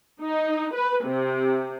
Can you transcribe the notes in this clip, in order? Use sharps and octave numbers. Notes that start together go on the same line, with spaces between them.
D#4
B4
C3